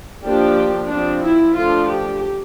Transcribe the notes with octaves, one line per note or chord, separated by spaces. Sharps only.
F3 A#3 D4 G4
F3 C4 D4
E4
F3 A3 D4 F4
G4